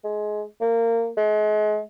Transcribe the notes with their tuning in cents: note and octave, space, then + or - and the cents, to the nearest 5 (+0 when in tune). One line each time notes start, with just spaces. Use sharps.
G#3 +20
A#3 -20
G#3 +35